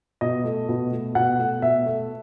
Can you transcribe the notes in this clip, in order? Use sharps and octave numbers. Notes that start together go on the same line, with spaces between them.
B2 D#5
A3
B2
A3
B2 F#5
A3
B2 E5
A3